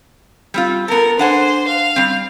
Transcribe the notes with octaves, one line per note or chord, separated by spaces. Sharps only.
G3 C4 F4
B3 A4 A#4
D4 C5 F#5 G#5
F5
G3 C4